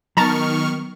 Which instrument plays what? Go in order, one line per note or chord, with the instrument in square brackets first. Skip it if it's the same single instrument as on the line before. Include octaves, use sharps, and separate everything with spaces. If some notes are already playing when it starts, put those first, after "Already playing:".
[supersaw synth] D#3 C#6 F6 [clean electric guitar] F#3 B3 [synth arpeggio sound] A5 A#5 A6